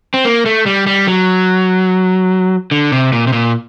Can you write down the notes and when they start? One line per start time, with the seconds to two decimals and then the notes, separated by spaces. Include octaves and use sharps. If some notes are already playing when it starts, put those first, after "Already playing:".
0.14 C4
0.25 A#3
0.46 A3
0.66 G3
0.87 G3
1.08 F#3
2.71 D3
2.92 C3
3.12 A#2
3.27 C3
3.33 A#2